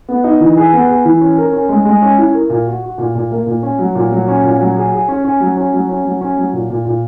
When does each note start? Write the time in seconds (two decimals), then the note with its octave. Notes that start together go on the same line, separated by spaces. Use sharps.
0.09 B3
0.24 D#4
0.40 E3
0.57 G#4
0.73 B3
0.89 G#4
1.05 E3
1.21 C#4
1.38 A#4
1.53 C#4
1.69 G#3
1.85 G#3
2.02 C#4
2.18 E4
2.34 A#4
2.50 A#2
2.67 F#4
2.83 F#4
2.98 A#2
3.15 A#2
3.31 A#3
3.47 A#2
3.63 C#4
3.79 F#3
3.95 A#2
4.12 F#3
4.28 C#4
4.43 A#2
4.60 F#3
4.76 G#4
4.92 G#4
5.08 C#4
5.24 C#4
5.40 F#3
5.57 C#4
5.73 F#3
5.89 C#4
6.05 F#3
6.21 C#4
6.37 F#3
6.53 A#2
6.70 A#2
6.85 A#2